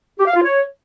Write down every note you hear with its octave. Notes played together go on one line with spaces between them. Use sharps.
G4
F5
F4
C#5